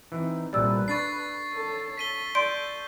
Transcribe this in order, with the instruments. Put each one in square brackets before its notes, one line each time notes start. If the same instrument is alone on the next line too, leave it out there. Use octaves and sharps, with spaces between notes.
[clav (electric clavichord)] E3 [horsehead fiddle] C4 D#4
[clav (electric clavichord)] C2 A#2 G3 [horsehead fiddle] A4 B4 [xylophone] D5 E6
[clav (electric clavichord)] D4 [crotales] C#6 A6 C7
[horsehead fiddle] A4 C#5
[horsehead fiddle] A4 [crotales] B6 D#7 G7
[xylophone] D5 C6 D7 [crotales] G6